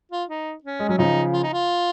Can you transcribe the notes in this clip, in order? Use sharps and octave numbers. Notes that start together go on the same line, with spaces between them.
F4
D#4
C#4
G#3
F#3 C#4
C#3 F3 D#4
F4
D#4
F4